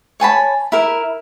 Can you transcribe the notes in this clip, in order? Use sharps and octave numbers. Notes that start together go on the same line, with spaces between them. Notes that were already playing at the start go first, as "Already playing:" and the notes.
C#5 G#5 A5 B5
E4 A#4